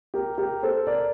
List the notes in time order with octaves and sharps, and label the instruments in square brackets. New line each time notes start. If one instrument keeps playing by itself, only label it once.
[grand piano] G4 A#4
G4 A#4
A4 C5
A#4 D5